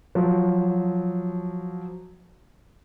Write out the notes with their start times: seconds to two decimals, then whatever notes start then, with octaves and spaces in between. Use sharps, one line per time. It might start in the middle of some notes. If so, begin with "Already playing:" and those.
0.15 F3 F#3